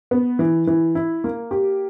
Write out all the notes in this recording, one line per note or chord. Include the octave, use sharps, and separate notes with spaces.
B3
E3
E3
E4
A#3
G4